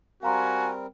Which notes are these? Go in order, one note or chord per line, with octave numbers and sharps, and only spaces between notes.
G3 C4 F#4 A#4 F5 G#5 A#5 C6